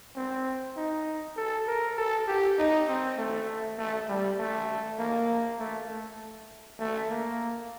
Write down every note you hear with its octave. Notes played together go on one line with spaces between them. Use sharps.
C4
D#4
A4
A#4
A4
G4
D#4
C4
A3
A3
G3
A3
A#3
A3
A3
A3
A#3